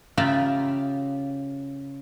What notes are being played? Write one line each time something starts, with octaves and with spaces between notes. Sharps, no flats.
C#3 F4 G4 E5 A#5 B5